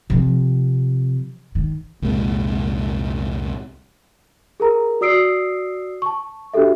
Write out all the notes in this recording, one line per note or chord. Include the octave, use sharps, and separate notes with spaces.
C3 F3
D#3
C2 F2 A#2 G#3
G#4 A#4 A#5
F#4 D5 D#6 E6 C7 D7
A5 C#6
D4 F#4 G4 A4 E5